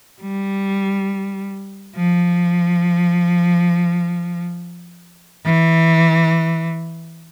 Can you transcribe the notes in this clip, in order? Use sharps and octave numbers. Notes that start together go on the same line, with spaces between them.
G3
F3
E3